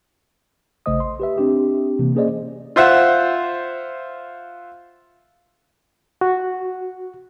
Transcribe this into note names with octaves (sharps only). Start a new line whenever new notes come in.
A1 C#3 A3 C5 D#5 D#6
C6
G4 B4 E5
C4 D4 G4
C3 E3 A#3
A#3 C#4 G#4 C5 D5 D#5
F4 C5 E5 F#5
F#4